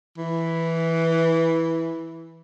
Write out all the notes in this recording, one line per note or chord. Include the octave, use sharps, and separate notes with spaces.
E3